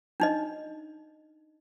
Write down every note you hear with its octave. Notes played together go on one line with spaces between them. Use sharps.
D4 D#4 D#5